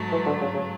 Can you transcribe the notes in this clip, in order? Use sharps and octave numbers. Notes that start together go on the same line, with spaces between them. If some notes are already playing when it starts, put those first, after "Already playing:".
Already playing: G#2 F#3 A3
E3
D3
C#3
C#3